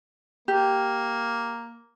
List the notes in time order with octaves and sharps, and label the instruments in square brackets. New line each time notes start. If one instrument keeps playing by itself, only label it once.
[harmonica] A#3 [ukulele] G4